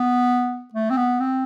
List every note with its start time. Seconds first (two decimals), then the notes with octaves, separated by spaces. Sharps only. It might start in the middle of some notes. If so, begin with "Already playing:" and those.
Already playing: B3
0.73 A3
0.90 C4
0.97 B3
1.20 C4